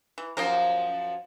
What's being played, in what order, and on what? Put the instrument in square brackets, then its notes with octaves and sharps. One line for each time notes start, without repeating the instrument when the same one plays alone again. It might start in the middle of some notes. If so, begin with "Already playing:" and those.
[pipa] E3
[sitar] F#2 F3 C5 [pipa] A#3 G4 A#4